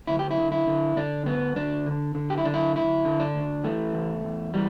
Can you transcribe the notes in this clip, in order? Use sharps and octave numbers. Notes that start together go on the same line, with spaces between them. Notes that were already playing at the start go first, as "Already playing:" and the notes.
D2 E4
G4
E4
D3
E4
D3
D3 D4
D2 B3
D2 D4
D3
D3
G4
E4
D3 D4
E4
D2 E4
D3
D4
D2
E3 A3
E2
E2
E3 G3